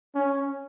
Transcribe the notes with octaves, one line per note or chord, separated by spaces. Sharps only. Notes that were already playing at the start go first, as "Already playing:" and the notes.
C#4